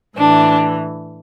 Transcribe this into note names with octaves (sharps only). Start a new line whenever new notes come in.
A2 E3 D4